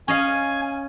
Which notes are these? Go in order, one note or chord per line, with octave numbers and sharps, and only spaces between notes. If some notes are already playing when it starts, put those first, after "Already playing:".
C#4 D#5 F5 G#5